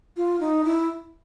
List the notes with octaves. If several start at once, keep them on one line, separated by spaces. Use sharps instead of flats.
F4
D#4
E4